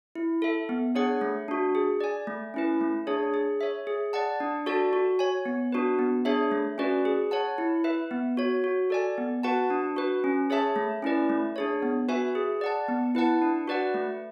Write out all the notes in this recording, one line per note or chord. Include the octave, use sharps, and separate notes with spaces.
E4
A4 E5
B3
D4 G#4 C#5 F#5
A3
D4 F#4
G#4
D5 G#5
A3
C#4 E4 B4
A3
D4 G#4 C#5
G#4
C#5 E5
G#4
D5 F#5 A5
D4
F#4 A4 D5 A5
F#4
C#5 G#5
B3
D4 F#4 B4
B3
D4 G#4 C#5 E5
A3
C#4 F#4 B4 D5
G#4
C#5 F#5 A5
E4
B4 E5
B3
F#4 C#5
F#4
A4 D5 G#5
B3
F#4 B4 F#5 A5
D4
F#4 B4
C#4
G#4 C#5 E5 A5
A3
C#4 E4 B4 D5
A3
D4 G#4 C#5
B3
F#4 B4 E5 G#5
G#4
D5 F#5 A5
B3
E4 B4 F#5 A5
D4
F#4 B4 D5 F#5
A3